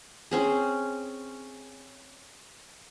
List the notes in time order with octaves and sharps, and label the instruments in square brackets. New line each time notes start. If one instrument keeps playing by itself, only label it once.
[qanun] C4 C#4 G#4